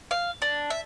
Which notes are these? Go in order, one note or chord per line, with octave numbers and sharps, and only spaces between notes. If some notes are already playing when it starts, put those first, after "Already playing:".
F5
D4
E5